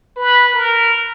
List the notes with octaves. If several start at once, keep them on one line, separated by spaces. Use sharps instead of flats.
B4
A#4